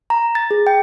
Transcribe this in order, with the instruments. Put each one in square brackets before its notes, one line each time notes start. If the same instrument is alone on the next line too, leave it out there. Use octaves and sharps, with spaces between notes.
[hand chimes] A#5
A6
G#4
G5